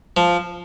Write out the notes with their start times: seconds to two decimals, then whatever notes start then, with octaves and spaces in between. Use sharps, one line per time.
0.17 F3